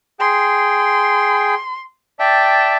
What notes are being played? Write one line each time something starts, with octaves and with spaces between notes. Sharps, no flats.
G#4 G5 C6
D5 E5 G5 A5